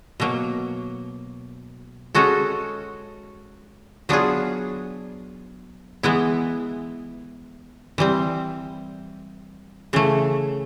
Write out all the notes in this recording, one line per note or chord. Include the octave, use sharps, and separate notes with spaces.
B2 F#3 A#3
G#3 C#4 F#4 A4
F#3 B3 D4 F4 G#4
E3 G#3 B3 E4
E3 G3 C4
C#3 E3 A3